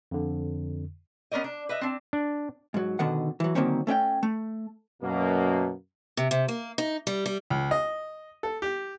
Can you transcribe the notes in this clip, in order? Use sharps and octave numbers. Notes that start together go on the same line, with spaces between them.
F2 D3
B3 C#4 A#4 D5 D#5
D4
B4 D#5 E5
C4 D4
D4
G#2 F#3
B2 D3 D#3 F#5
E3 F#3
D3 D#3 F#3 A#3 C4 C#4
A3 C#4 D5 G5
A3
F#2 B2 A#3
C3
C3
A#3
D#4
G3
G3
C#2
D#5
A4
G4